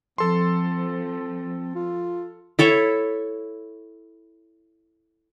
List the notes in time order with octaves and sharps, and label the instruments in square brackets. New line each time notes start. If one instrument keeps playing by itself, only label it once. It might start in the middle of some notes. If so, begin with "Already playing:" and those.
[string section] F3 [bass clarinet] C4 [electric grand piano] A4 C6
[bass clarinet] F4
[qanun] E4 A4 C#5 E5